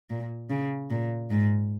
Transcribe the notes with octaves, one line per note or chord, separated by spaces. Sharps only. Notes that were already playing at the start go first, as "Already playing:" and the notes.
A#2
C#3
A#2
G#2